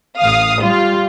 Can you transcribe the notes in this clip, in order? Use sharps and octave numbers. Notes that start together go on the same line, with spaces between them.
A1 F5 D#6
G3 F4